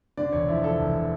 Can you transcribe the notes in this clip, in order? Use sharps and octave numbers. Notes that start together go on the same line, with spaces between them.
D3 D5
E1 C#5
F3 E4
F3 A4
E1